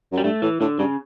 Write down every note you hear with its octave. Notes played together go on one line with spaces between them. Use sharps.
F#2
G3
G2 A3
A2 E3
A2 D3
G2 C#3